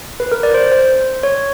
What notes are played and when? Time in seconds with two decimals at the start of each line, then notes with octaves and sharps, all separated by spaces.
0.20 B4
0.32 A#4
0.43 D5
0.54 C5
0.72 C5
1.23 C#5